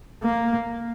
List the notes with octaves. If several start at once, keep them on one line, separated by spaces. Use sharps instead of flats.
A#3